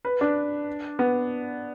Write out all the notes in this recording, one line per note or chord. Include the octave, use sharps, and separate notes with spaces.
B4
D4
B3